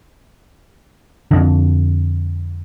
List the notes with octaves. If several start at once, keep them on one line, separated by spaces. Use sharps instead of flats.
F2 D3